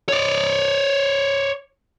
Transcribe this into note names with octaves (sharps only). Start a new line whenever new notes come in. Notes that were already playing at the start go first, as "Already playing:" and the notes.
C#5 D5